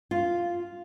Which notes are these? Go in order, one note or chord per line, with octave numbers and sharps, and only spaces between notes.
F4